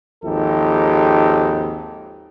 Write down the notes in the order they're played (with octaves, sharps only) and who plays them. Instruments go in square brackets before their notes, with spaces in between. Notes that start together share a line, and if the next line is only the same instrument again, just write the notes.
[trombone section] G#1 D#2 F3 D#4 G4 A4